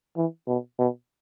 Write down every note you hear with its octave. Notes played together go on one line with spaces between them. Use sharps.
E3
B2
B2